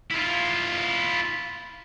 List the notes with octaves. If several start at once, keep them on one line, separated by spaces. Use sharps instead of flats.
E4 F4